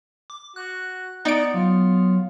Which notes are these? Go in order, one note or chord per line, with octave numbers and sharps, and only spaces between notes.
D6
F#4 F#6
B3 D#4 D5 D7
F#3 F4